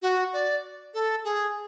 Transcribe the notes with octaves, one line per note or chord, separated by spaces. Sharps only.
F#4
D5
A4
G#4